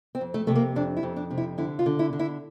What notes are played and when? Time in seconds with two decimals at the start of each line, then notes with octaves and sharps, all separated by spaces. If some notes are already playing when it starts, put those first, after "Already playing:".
0.15 C4
0.21 F2
0.34 A3
0.47 C3 A3
0.55 A#3
0.76 F2 D4
0.97 E4
1.03 F2
1.16 D4
1.31 C3
1.38 E4
1.58 D3 E4
1.79 F4
1.86 D3
1.99 E4
2.13 D3
2.19 E4